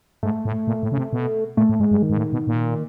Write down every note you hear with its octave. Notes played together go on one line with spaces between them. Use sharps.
G#2 A3
A2
A#2
A2
C#3
C3
B2
A#2 A3
A2
G#2 G#3
G2
D#3
G#2
A2
B2
A#2